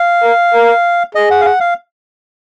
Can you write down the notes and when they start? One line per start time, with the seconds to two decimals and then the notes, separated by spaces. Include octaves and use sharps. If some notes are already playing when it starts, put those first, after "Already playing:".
Already playing: F5
0.23 A#4
0.54 A#4
1.15 G#4 D#5
1.31 F#5
1.41 F5
1.45 F#5
1.60 F5